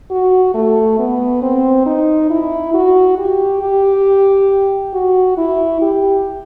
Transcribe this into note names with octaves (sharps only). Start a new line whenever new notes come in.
F#4
A3
B3
C4
D#4
E4
F#4
G4
G4
F#4
E4
G4